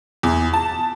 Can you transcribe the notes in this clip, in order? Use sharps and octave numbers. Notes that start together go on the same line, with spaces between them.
E2
A5